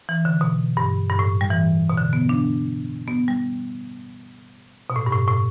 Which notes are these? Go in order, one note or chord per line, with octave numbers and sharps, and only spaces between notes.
E3
D3
B2
G2
G2
A2
G3
E3
B2
D3
B3
D4
B3
G3
B2
A2
G2
A2
A2